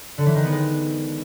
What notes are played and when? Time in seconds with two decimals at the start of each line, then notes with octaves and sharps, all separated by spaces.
0.18 D3
0.26 E3
0.35 D#3
0.44 B3
0.52 G#3